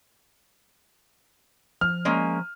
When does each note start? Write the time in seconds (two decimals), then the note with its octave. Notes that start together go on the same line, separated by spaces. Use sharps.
1.81 F3 F6
2.05 G#3 A#3 C#4